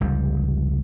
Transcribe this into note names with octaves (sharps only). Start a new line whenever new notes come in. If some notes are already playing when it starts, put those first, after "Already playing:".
F1 C#2 G3